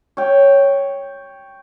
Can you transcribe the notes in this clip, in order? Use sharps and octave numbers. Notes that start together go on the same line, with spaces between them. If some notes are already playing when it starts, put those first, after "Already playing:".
C#5 G5